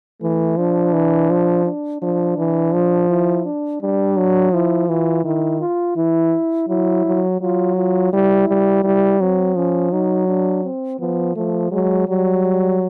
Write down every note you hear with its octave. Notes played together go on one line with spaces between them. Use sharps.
E3 A3
F3 D4
E3
F3
D4
F3 D4
E3
F3
E4
D4
G3 D4
F#3
F3 E4
E3 F4
D#3 E4
F4
E3 E4
F#3 E4
F#3
F#3 F4
F4
G3 E4
G3
G3 E4
F#3 C4
F3 C#4
F#3 D#4
D4
C4
F3 B3
F3 A3
F#3 G#3
F#3 G3